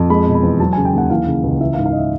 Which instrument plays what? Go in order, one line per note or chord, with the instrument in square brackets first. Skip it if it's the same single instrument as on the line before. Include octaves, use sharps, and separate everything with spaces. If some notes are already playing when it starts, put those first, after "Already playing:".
Already playing: [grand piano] F2
G#3 B5
B2
B5
E2
F#3 A5
G#5
C#3
G5
D#2 F#5
E3 F5
C#3
C#2
E3 E5
F5
G#2
F5
D#5
E5